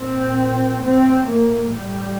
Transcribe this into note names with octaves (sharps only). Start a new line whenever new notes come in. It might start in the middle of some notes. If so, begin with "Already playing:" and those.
Already playing: A#2 C4
A2 C4
A#3
A2 G3